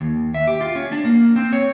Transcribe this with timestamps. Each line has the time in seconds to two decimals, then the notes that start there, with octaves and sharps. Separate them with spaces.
0.01 D#2
0.34 E5
0.47 G4
0.61 F4
0.75 C#4
0.92 D4
1.05 A#3
1.36 C4
1.53 C#5